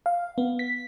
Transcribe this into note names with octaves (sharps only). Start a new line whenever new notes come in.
F5
B3
B6